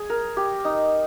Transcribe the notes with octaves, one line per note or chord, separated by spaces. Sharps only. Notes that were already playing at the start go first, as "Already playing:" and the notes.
Already playing: G#4
A#4
G4
D#4